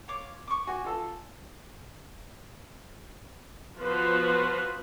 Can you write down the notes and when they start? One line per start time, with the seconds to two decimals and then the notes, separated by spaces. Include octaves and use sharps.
0.08 F4 C#5 D6
0.47 C#6 D6
0.67 F#4 G#5
0.84 F4 A4
3.77 F3 B3 F4 F#4 B4 C5